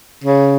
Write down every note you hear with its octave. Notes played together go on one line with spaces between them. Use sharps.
C#3